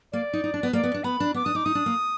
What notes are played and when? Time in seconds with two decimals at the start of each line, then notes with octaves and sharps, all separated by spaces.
0.12 A#3 D5
0.33 D#4
0.44 D#4
0.54 D4
0.63 B3
0.73 A#3 D5
0.83 B3
0.94 D4
1.04 B3 B5
1.20 D4
1.34 B3 D6
1.45 D4 D#6
1.55 D#4 D6
1.65 D#4 D#6
1.75 D4
1.86 A#3